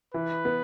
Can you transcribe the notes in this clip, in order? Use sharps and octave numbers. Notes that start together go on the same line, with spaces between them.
E3 B4
B3